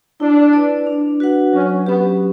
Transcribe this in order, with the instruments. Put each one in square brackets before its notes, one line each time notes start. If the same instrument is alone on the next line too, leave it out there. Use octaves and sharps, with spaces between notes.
[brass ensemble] D4 [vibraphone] E4
[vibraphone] B4 D5
D4
F#4 B4 F#5
[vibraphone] F#3 [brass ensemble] C#4
[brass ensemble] B3 [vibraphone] C#4 G4